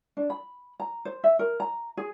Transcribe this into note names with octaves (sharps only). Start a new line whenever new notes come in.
D4
B5
A#5
C5
E5
A#4
A#5
G#4